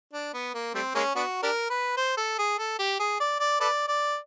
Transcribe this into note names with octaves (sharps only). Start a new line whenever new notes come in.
D4
B3
A#3
G3 A3 C4
G#3 A#3 C#4
B3 D4 F#4
D4 G4 A#4
B4
C5
A4
G#4
A4
G4
G#4
D5
D5
A4 B4 D5
D5